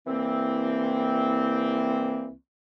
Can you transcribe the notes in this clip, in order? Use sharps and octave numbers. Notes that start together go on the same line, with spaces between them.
C2 E3 A#3 C4